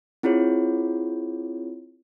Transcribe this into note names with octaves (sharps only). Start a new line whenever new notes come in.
C4 E4 F4 G#4 C#5